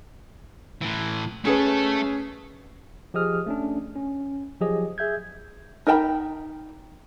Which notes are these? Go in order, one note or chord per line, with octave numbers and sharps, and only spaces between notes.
A2 E3
A3 C#4 G#4 A4 B4
F3 G4 G#4 D#5 D#6 F6
A3 C#4 D4
C#4
F3 F#3 G4 G#4 D#5
G#4 E5 G6 G#6
D#4 A#4 G5 A5 B5